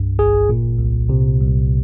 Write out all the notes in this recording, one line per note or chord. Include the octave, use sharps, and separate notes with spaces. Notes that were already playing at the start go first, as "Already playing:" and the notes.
Already playing: C2 G2
G#1 G#4
A#2
C2
C3
C2